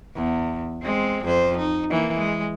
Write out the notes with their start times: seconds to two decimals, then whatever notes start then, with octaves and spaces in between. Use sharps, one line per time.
0.16 E2
0.83 G#3 C4
1.25 F2 C5
1.58 D#4
1.90 E3 A#3
2.18 G#3